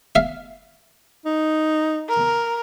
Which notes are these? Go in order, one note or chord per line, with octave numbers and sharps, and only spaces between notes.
E5 F5
D#4
A#4